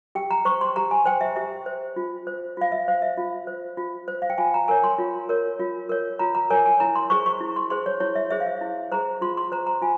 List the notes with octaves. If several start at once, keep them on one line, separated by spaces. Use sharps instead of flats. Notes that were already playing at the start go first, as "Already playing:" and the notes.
G4 G5
A#5
C5 C#6
C6
G4 A#5
G#5
C5 G5
E5
G4 E5
C5
F4
C5
F4 F5
E5
C5 F5
E5
F4
C5
F4
C5
F5
G5
F4 G#5
A#5
A#4 C#5 G#5
C6
F4
A#4 C#5
F4
A#4 C#5
F4 A#5
A#5
A#4 C#5 G#5
G#5
E4 A#5
C6
G#4 C5 C#6
C#6
E4
C6
G#4 C5 C6
C#5
E4 C#5
E5
G#4 C5 E5
F5
E5
E4
G#4 C5 A#5
F4 C6
C6
C5 A#5
A#5
F4 G#5